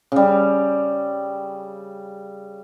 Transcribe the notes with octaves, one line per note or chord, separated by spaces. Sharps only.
C#3 G3